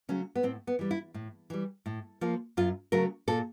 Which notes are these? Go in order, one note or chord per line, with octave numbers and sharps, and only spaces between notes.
C#3 F#3 A3 C#4
B3
A2 C4
B3
E3 G3
E4
A2
E3 G3
A2
F3 A#3
F#2 F4
C#3 F#3 A3 A#4
A#2 A4